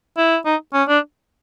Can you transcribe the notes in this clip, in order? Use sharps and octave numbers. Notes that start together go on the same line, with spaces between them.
E4
D#4
C#4
D4